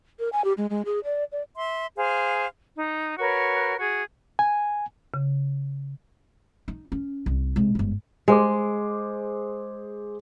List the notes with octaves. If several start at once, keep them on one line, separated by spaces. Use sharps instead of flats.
A#4
G#5
G4
G#3
G#3
G#4
D5
D5
E5 C6
G#4 C5 F5
D#4
F#4 A#4 B4 C#5
F#4 G#4
G#5
C#3
D#4
C#4
C2
C3 G#3
G1 G#2
G#3 G#4 C5 D6